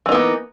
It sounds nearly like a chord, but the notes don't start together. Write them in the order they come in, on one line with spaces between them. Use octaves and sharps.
E3 D#4 B3 A#3